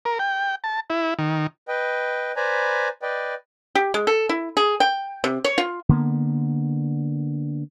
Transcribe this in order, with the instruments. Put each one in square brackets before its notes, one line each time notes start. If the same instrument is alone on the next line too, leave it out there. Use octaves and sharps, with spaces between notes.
[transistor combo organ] A#4
G5
A5
E4
D#3
[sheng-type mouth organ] B4 D#5 G5
B4 C5 D5 G#5 A#5 B5
B4 D5 D#5 G5
[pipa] G4
G#3
A4
E4
G#4
G5
C3
C#5
F4
[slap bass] D3 A#3 B3